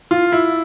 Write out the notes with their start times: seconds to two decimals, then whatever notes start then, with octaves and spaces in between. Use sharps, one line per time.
0.11 F4
0.32 E4